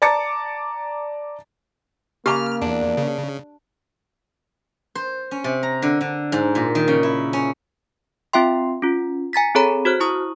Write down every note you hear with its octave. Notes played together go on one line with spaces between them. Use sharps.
D5 A5 A#5 D6 A6 C#7
C#3 A#3 G4 A#5 D6 F6
E2 D4
C#3
C5
C#4
C3
A#5
D3
D3
G#2
A#2
D#3
C#3
E4
C#4
C4 F4 E5 G5 C6
C#4 F4
G#5 A#5 A6 B6
C4 G#4 A4 C#5 A#5 B5
F#4 C5 F6 F#6
E4 A#5 C#6 D#6